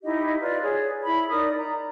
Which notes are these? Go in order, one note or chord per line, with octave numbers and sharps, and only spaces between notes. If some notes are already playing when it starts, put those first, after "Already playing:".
D#4 E4 G4 D#5
F4 B4 D5
G#4 C#5
E4 B5
D#4 A#4 D5 D#6
A#5